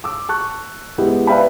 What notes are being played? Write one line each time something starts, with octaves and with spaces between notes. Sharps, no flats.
D6 E6
A5 C#6 F#6
G#3 B3 E4 G4
B4 D5 E5 F5 G5 B5